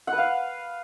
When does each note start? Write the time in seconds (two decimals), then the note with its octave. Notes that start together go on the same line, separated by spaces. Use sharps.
0.07 F#5
0.13 B4
0.18 F5